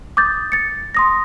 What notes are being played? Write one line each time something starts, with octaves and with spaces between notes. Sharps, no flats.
D6 D#6 G6 A6
A6 C#7
C6 D#6 A#6